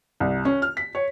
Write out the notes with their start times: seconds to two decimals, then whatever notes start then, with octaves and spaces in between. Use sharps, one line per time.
0.20 C2
0.45 C#4
0.62 F6
0.77 B6
0.95 C#5